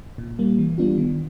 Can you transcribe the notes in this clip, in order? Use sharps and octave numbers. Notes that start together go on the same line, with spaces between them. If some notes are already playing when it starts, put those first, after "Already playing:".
A#2
G3 A#3
E3
G3 B3 D4 F4
D#3